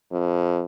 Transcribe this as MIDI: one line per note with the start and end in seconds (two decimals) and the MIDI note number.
0.12 0.64 41